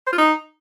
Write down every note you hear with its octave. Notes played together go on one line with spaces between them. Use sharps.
C5
F4
D#4